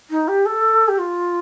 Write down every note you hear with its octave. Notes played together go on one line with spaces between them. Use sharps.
D#4
G4
A4
G4
F4